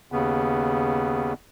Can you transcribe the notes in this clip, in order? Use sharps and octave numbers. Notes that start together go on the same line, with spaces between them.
D#2 C#3 B3